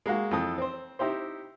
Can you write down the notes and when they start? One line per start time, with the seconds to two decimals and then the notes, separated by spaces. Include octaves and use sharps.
0.06 G#3 A#3 F#4
0.31 F2 E3 A4 D#6
0.58 C4 C5
0.99 C4 D#4 E4 G4 C5